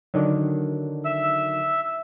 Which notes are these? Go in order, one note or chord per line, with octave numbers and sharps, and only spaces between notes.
D3 D#3 F#3
E5 E6